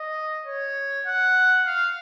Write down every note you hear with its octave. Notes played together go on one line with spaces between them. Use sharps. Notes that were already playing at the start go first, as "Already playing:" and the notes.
Already playing: D#5
C#5
F#5
F5